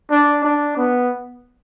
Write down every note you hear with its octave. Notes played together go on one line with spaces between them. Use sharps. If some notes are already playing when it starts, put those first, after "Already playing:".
D4
D4
B3